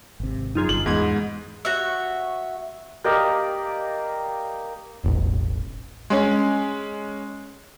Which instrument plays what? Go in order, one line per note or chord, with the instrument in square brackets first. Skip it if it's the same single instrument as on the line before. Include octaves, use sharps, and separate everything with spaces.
[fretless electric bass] G#1 C3
[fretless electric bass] F#2 [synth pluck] D#4 F4 G#4
[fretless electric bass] G1 G2 [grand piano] F#7
[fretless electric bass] E2 [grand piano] G#2 [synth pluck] B3 G#6
[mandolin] F#4 C#5 E5
[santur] A#3 G4 D5 D#5
[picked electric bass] E1 A1
[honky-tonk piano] G#3 C#4